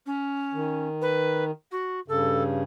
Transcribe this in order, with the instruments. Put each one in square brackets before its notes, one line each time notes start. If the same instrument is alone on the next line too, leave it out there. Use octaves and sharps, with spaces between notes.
[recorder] C#4
[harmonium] D#3
[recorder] B4
F#4
[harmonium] G2 C#3 [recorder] A4